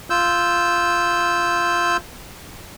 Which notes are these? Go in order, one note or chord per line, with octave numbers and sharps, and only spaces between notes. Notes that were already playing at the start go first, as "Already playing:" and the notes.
F4 E6 G6